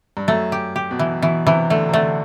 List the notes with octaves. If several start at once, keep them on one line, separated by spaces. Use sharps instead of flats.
G2
F#2 A3
G4
G4
B2
E3
B2 E3
C3 E3
D3 A3
C3
D3 A3